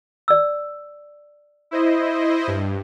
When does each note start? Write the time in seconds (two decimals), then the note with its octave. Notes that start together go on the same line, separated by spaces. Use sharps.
0.28 D5 E6
1.71 E4 C5 D#5
2.47 G2